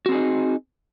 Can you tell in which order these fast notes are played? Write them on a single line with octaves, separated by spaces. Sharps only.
F#4 C4 G#4 D#4